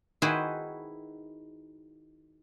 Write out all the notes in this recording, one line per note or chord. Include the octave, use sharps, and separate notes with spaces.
D#3 E4 F#4 G#4 B4 C5